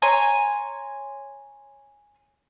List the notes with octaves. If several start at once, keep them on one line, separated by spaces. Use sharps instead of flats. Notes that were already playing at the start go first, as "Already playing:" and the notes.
C#5 G#5 A#5 C6